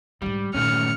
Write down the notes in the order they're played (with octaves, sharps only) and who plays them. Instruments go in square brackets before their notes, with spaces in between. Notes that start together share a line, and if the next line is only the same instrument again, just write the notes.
[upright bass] G#2 D3 [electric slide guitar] G3
[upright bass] G2 A#2 [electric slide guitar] D#3 A3 C#4 [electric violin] F6 C#7